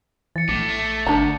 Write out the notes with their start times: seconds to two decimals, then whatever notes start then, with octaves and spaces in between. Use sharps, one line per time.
0.36 E3 A6 C#7
0.49 A#1 A2 D6
0.68 A3
1.07 G#1 D2 D4 A#5